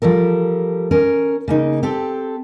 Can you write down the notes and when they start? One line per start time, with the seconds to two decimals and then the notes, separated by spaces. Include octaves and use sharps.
0.02 F3 G3 A4 A#4
0.91 C#4 A#4
1.48 C#3 A#3 D#4
1.83 C4 G4 A4